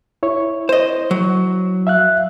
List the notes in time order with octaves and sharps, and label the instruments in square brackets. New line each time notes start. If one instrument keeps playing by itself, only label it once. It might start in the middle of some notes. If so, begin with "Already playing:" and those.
[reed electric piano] E4 C#5
[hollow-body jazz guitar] C5 D#5
F#3
[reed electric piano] E5 F5 F#6